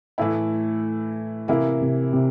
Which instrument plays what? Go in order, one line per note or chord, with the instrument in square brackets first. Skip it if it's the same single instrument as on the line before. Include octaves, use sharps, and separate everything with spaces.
[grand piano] A2 [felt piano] E3 A3 E4
[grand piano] C3 [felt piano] E3 A#3 E4
[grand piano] C3
C3